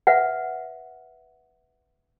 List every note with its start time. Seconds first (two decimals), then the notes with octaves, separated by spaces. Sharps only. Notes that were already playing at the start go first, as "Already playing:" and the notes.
0.07 B4 E5 F#5